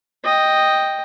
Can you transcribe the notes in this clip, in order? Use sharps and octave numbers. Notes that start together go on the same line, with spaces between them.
D#5 G5